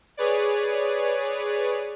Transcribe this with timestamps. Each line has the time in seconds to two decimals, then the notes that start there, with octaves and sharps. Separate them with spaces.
0.17 G#4 B4 C#5 D5